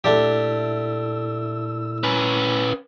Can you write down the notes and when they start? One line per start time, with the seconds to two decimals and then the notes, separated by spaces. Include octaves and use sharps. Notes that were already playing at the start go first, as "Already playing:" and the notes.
0.04 A#2 A3 D4 E4 G4 E6
2.03 C#4 B4